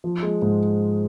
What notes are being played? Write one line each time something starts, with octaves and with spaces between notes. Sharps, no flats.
F3
G#3
G#2